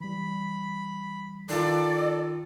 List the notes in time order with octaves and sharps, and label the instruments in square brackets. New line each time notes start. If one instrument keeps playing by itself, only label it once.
[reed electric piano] E3 G3 [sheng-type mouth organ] B5
[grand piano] D#3 F4 [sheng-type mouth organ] A4 [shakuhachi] D5